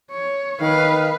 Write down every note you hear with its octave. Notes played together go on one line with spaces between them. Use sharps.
C#5
D#3 B4 F5